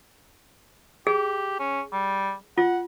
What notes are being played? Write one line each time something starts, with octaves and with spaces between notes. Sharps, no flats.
G4 G#4
C#4
G3
F4 F#5